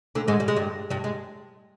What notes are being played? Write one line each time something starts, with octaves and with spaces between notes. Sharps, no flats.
D2 D3
G#2 G#3
G3
G#3
G2 G3
G2 G3
G#3